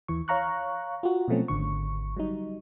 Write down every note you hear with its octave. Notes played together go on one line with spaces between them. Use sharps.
D#2 E3 C#6
C#5 F5 A#5 C#6 F#6
F4 F#4
B2 F3 F#3 A3 C4 C#4
G#1 D3 C#6
F#3 G3 D#4